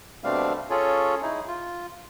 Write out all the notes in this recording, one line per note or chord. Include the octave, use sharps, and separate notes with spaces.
B2 G3 A3 C4 D4 F5
C#4 F4 G#4 A4 C#5
D#4 E4 G#4
F4